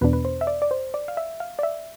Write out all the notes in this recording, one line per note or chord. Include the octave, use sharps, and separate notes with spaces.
E2 B2 B3 D4 B4
B4
C5
E5
D5
D5
C5
D5
F5
E5
F5
D5
E5